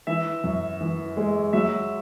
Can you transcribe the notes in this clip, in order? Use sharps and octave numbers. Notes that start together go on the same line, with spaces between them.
E3 E5
F#2
E3
G#3
F#3 E5